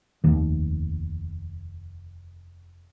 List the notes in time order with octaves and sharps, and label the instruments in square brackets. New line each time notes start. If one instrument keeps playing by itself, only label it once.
[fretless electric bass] F1 D#2 D#3